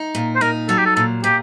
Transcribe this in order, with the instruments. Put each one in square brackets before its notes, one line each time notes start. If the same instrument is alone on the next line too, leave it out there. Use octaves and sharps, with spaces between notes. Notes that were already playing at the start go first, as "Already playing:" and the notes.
Already playing: [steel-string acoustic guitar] D#4
A#2
[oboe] C5
[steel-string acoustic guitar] D#4 [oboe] A#4
[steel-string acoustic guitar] F#3 [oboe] A4
[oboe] G4
A4
[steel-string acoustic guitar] A#2 [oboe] A4
[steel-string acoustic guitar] A#2 [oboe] G4